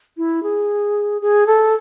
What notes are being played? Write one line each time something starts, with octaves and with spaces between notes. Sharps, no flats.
E4
G#4
G#4
A4